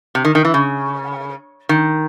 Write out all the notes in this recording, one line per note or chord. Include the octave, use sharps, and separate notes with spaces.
C3
D#3
D#3
E3
C#3
D#3